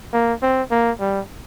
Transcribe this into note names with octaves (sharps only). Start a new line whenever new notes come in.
A#3
C4
A#3
G3